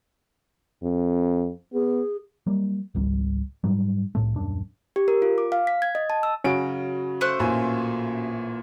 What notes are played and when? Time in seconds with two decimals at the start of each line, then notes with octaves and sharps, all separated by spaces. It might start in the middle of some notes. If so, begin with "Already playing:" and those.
0.83 F2
1.73 B3 G#4
2.47 F#3 G3 A#3
2.95 G#1 C#2 G3
3.64 G#2 F#3 G3
4.15 C2 A2 A3
4.36 D#1 F#2 D4
4.96 G4
5.08 A#4
5.22 F4
5.38 D6
5.52 F5
5.67 B6
5.82 G#6
5.95 D#5
6.10 A5
6.23 E6
6.44 C#3 F#3 C#4 F#4 D7
7.21 A3 C5 F#6
7.39 A1 A#2 G#5